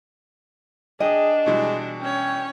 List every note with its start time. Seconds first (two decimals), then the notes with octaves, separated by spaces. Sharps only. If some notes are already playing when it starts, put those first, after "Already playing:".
1.00 D4 G#4 D#5 G5 D#6
1.46 B2 E3 G3 G#3
2.01 C#4 C#5 G5